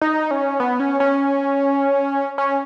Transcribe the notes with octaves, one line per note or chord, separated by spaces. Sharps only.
D#4
C#4
B3
C#4
C#4
C#4